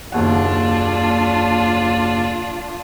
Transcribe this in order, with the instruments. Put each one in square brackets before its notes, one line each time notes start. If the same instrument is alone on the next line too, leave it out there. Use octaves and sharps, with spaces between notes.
[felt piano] F#1 D#2 F#5 [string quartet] D4 F4